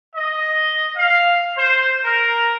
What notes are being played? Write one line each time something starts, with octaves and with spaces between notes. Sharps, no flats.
D#5
F5
C5
A#4